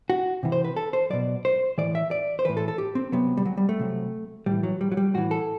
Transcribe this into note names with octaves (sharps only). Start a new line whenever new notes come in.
F#4
C3 E3
C5
B4
A4
C5
B2 F#3 D5
C5
A2 E3 D5
E5
D5
C5
A2 E3 B4
A4
A4
G4
C4
C3 F#3 B3
G3
F#3
G3
A3
C3 F#3
A2 E3 G3
F#3
G3
F#3
G3
A2 E3 F#4
A4